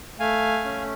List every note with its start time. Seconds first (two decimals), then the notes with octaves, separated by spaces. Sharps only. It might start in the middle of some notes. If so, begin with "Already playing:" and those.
0.20 A3 F5 G#5
0.64 C#4